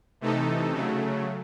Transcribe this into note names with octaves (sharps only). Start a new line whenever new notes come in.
C3 E3 A3 D#4 A4
C#3 F#3 A3